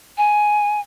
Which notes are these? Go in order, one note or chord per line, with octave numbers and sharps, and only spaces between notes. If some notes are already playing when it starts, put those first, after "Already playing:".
G#5